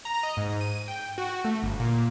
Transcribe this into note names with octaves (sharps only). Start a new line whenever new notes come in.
A#5
D#5
G#2
D#7
G5
F#4
A3
G1
A#2